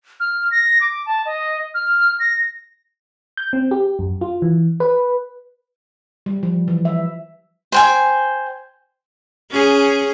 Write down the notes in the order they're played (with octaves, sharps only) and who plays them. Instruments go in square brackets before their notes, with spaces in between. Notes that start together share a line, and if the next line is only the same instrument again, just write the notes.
[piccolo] F6
A#6
D6
A5
D#5
F6
A#6
[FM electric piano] G6
C4
G4
F#2
F4
E3
B4
[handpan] G3
F3
E3
E5
[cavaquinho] C5 G5 G#5
[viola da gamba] C#4 G#4